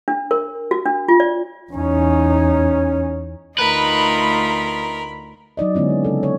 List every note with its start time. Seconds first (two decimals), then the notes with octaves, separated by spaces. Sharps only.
0.08 D4
0.31 A#4
0.71 F#4
0.86 D4
1.08 F4
1.20 D5
1.72 E2 C#4 D#4
3.58 D2 A3 D#4 F4 A#4 B4 B5
5.57 F#3 D#4 D5 D#5
5.75 D3 G#3 B3 C#4 E4
5.90 C4
6.05 C#3 A4
6.23 C#5